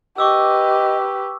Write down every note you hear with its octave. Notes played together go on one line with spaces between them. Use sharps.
G4 B4 D#5 C#6 D6 E6